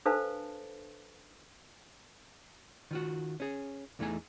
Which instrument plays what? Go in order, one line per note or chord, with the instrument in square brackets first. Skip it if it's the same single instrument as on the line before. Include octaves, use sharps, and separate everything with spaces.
[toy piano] D4 A4 B4 C5 F5 A5
[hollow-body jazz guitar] D#3 F4 F#4
C#4 G#4
E2 E3 A3 D#4 G#5